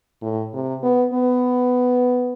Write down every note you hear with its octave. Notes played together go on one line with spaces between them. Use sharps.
A2
C3
B3
B3